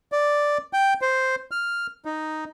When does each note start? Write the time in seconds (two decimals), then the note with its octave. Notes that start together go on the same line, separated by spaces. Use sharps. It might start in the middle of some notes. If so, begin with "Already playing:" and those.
0.12 D5
0.73 G5
1.02 C5
1.51 F6
2.05 D#4